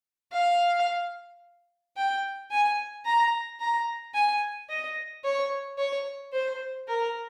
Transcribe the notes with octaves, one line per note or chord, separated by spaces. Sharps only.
F5
G5
G#5
A#5
A#5
G#5
D#5
C#5
C#5
C5
A#4